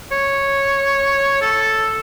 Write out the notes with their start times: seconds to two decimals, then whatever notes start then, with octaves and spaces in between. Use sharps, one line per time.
0.12 C#5
1.42 A4